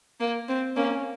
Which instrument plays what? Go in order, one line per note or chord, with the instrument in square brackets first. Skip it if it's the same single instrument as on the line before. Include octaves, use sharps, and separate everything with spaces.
[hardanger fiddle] A#3
C4
[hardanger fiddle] A#3 [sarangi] C#4